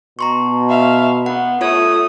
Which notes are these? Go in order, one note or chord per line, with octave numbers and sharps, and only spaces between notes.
B2 A#5 C6 C#6
E5 F5
B3 F#5
A3 F4 C#5 D#6 G#6